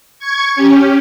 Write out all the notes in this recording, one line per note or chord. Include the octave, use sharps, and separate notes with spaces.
C#6 G#6
C#4 G4